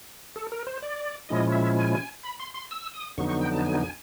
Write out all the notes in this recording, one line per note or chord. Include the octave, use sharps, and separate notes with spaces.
A4
A#4
C5
D5
A#2 F3 G#3 C#4 E4 D#5
E5
G#5
B5
C6
C6
E6
D#6
F2 D3 F#3 B3 D#4 C#6
C#6
G5
A5
G#5
G#5